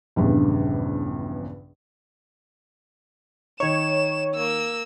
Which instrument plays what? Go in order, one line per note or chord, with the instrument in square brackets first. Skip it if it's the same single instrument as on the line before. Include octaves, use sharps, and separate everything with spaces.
[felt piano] A#1 E2 G2 C#3
[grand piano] D#3 D#4 [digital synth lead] C#5 [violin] E7
[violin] A#3 E6